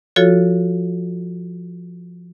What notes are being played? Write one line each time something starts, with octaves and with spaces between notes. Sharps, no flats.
F3 F4 F#4 A4 C#5